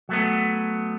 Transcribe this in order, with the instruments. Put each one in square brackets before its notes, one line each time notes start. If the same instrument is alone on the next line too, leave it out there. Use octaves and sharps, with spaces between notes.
[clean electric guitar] F#3 A3 B3